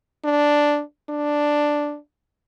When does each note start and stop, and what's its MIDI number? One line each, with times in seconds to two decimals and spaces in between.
0.25 0.82 62
1.09 1.97 62